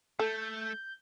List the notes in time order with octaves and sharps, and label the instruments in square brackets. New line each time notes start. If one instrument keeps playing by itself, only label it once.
[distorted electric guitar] A3 [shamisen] A4 [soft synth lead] G6